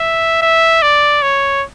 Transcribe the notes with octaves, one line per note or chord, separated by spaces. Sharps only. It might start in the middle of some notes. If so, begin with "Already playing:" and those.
Already playing: E5
E5
D5
C#5